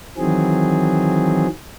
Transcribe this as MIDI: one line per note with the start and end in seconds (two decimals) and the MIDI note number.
0.18 1.47 51
0.18 1.47 52
0.18 1.47 54
0.18 1.47 60
0.18 1.47 68